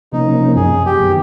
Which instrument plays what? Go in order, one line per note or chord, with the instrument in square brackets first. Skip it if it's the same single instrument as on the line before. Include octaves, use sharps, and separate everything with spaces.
[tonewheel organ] C3 F3 A#3 C#4 [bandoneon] D#4
[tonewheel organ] F#2 [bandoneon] G#4
[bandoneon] G4
[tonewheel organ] D#3 F#3 B3